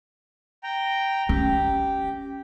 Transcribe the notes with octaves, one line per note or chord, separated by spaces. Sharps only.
G5 A#5
C#4 G4